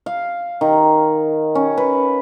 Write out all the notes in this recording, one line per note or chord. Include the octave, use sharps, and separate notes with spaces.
F5
D#3
C#4
B4